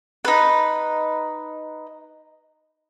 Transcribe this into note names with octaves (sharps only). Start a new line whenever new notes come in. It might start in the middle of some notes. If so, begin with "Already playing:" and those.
D#4 B4